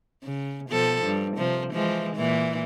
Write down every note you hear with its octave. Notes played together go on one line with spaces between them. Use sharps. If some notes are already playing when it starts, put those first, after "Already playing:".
C#3
B2 F3 A4
G2
C3 F3
E3 F3 G#3
A#2 E3